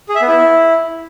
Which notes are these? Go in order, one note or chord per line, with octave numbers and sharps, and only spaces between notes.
G#4
E5
B3
E4